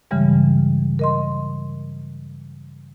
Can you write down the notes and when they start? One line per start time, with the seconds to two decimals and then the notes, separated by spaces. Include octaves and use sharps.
0.11 G2 C#3 E3 G3 G#3
0.99 A#4 D#5 C6